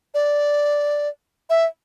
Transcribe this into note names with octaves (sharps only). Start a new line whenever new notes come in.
D5
E5